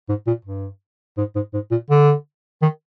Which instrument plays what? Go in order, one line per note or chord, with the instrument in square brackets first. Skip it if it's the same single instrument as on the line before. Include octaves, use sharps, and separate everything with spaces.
[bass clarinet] G#2
A#2
G2
G#2
G#2
G#2
A#2
D3
D#3